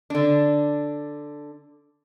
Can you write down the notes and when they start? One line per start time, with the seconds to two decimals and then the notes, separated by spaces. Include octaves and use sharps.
0.10 D3 D4